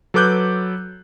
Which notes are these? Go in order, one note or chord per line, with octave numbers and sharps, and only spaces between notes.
F#3 A4 B4 D6 F#6 G6